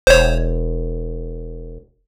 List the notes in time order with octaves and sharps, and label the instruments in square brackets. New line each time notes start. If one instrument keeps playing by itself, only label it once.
[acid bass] E1 [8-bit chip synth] C5 C#5